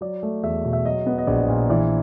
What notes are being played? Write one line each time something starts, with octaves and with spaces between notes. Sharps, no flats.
F#3 D5
A3
E2 E5
B2
E5
F#3 D#5
B3
D#5
A#1 D5
A#2
E3 D5